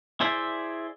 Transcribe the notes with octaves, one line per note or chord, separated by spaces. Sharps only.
E4 G#4 C5 D5 E5